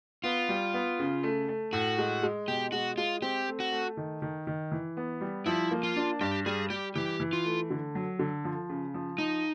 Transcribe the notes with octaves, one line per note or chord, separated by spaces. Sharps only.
B3 F4
G3
B3
C#3
A3
A3
A2 F#4
G#3
G#3
B2 G4
G#3 F#4
G#3 F4
C4 G4
A3
F#4
A3
D#3
D#3
D#3
E3
B3
G3
F3 E4
A#3
F4
D4
G2 G4
G3 G#4
G3 G4
E3 G4
E3
F4
A3
D3
F#3
D3
F3
C#3
F3
F3 D#4